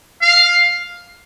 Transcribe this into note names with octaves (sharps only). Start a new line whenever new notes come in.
F5